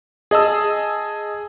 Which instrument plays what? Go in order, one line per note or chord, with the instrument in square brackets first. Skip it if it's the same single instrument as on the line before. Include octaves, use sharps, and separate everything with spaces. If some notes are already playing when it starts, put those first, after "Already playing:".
[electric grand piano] G#4 D#5 A5 E6